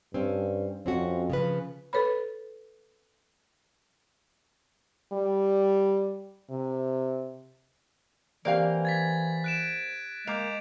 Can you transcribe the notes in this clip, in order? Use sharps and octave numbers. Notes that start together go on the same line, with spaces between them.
G2 C4 C#4
F2 C4 C#4 F#4
C#3 F3 B4
A4 B4 C#5 B5
G3
C3
E3 A#3 C4 G4 D5 F5
G#6 A6 B6
F#6 D7 E7
G#3 A#3 D6 G6 F7